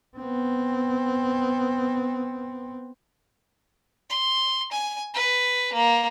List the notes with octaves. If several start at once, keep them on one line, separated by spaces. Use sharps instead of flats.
B3 C4
C6
G#5
B4
A#3